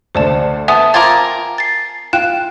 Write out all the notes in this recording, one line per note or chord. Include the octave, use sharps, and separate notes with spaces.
D2 D3 C5 D5 A5
B3 E5 G#5 A5
C4 F4 A#4 D6 G#6 A6
A6 C7
F4 G5 F#6 E7